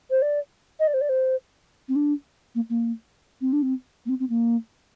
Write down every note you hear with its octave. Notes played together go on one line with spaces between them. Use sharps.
C5
D5
D#5
D5
C5
D5
C5
C4
D4
A#3
A#3
C4
D4
C4
A#3
C4
C4
A#3